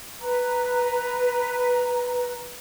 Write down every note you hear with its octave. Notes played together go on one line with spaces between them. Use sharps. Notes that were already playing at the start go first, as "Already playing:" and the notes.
B4 A#5